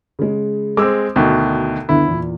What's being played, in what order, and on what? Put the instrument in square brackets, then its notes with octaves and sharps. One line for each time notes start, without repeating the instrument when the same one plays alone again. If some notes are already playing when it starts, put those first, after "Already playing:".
[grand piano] C#3 G#3
[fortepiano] G#3 C4 [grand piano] D6 E6
[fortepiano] D2 B2 D#3
[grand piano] D2 D3 B3 [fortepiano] E4
[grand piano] E2 A#2